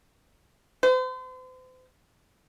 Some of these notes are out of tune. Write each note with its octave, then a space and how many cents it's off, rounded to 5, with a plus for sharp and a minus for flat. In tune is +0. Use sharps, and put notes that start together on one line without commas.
C5 -40